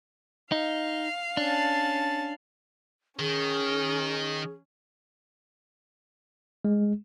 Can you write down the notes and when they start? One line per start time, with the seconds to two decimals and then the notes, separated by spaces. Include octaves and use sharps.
0.52 D#4 F5
1.37 C#4 D4 A5
3.19 D#3 C#4 G#4
6.65 G#3